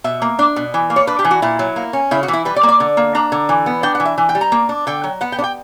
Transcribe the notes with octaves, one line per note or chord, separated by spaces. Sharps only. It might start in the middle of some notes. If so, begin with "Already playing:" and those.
B2 E5
A#3
D4
B2
E3
A#3
C#5
D4 B4
G4
E3
F#4
A#2 E4
F#3
A#3
C#4
C#3 E4
F#4
E3
E4
G3 B4
D5
A#3
D5
D3
A#3
D4 A#5
D3
E3
B3
D4 G5
F#5
E3
E5
E3
G5
G3
A#5
A#3
D4
D3 G5
F#3
B3 F#5
G5
D4
G5